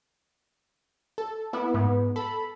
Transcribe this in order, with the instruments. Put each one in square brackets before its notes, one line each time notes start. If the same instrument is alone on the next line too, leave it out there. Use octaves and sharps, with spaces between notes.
[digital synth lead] A4
[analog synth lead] B3 [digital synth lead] E4
[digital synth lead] G#2 [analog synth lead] B3
[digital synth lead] A4 [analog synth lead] B5